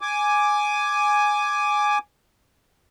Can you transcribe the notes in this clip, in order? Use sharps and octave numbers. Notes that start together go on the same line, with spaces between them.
G#5 D6